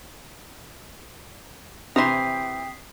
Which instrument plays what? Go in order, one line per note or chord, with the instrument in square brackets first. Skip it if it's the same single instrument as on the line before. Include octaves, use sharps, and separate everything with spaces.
[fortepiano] C3 [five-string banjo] E3 C5 A#5 [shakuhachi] G5 [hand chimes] D#6 B6 C7